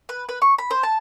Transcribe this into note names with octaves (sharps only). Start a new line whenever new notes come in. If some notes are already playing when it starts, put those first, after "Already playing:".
B4
B4
C#6
B5
C5
A5